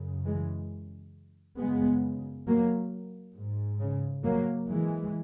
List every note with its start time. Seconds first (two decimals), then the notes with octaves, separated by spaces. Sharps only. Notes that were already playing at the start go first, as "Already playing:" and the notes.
Already playing: F#2 C#3
0.26 E3 G#3
1.59 F#2 C#3 G#3 B3
2.47 F#3 A#3
3.36 G#2
3.80 C#3
4.24 F#3 A#3
4.68 E3 G#3